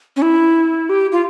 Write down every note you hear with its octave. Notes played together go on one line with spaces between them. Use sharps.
C#4
E4
G4
F4